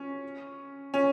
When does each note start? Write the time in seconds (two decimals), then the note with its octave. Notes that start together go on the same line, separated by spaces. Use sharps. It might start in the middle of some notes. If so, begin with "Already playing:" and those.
Already playing: C#4
0.94 C#4